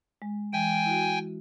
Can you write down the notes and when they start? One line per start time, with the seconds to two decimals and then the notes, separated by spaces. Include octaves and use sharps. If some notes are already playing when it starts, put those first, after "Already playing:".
0.22 G#3
0.53 E3 G#3 G5 G#5
0.86 E4 F#4